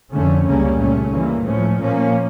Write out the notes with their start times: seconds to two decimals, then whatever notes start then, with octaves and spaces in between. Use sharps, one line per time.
0.12 F2 D3 A3 C#4
0.45 C#2 C#3 G3 A#3 C#4
0.78 A#2 A3 C#4
1.11 G2 E3 A#3
1.44 A2 F3 A3 C#4
1.77 A#2 F3 A#3 C#4